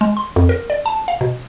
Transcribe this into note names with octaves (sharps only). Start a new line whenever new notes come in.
G#3
C6
F2
A#4
D5
A5
F5
B2